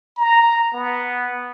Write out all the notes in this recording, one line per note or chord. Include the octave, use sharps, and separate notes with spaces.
A#5
B3